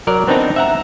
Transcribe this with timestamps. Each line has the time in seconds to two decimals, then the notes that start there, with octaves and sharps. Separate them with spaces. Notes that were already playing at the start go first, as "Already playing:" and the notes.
0.07 F#3 A#4 D5
0.27 B3 C4 D4 D#4 A#5
0.56 E5 F#5 A#5